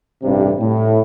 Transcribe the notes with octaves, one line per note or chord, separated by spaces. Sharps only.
A1 G2 C3
A2